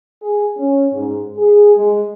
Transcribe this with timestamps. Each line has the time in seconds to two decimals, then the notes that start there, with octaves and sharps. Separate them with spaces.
0.22 G#4
0.57 C#4
0.93 G#2
1.36 G#4
1.76 G#3